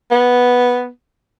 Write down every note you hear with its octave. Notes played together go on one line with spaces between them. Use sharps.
B3